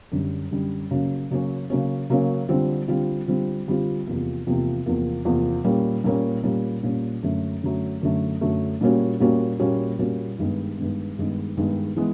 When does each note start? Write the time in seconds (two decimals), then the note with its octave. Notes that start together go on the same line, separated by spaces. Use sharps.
0.12 F#2 D3 G3
0.51 F#2 D3 G3
0.91 C#3 F#3 A#3 C#4
1.31 C#3 F#3 A#3 C#4
1.70 C#3 F#3 A#3 C#4
2.10 C#3 F#3 A#3 C#4
2.49 D3 G3 C4 F4
2.88 D3 G3 C4 F4
3.28 D3 G3 C4 F4
3.67 D3 G3 C4 F4
4.07 E2 C3 F3 A#3
4.47 E2 C3 F3 A#3
4.86 E2 C3 F3 A#3
5.25 E2 C3 F3 A#3
5.64 A#2 G3 A#3 C#4
6.04 A#2 G3 A#3 C#4
6.43 A#2 G3 A#3 C#4
6.83 A#2 G3 A#3 C#4
7.23 F#2 D3 F#3 A3
7.63 F#2 D3 F#3 A3
8.01 F#2 D3 F#3 A3
8.41 F#2 D3 F#3 A3
8.81 A#2 G3 A#3 C#4 F#4
9.20 A#2 G3 A#3 C#4 F#4
9.59 A#2 G3 A#3 C#4 F#4
9.99 A#2 G3 A#3 C#4 F#4
10.39 G2 D#3 G#3 B3
10.77 G2 D#3 G#3 B3
11.18 G2 D#3 G#3 B3
11.57 G2 D#3 G#3 B3
11.96 E3 G#3 B3